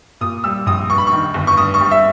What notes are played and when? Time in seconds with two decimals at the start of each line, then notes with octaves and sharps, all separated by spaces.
0.21 A#2 D#6
0.44 G3 E6
0.66 A#1 D#6
0.90 G2 C#6
0.98 B5
1.07 C#6
1.13 D#3
1.34 G1
1.47 C#6
1.57 G2 D#6
1.74 C#6
1.80 G3
1.91 E5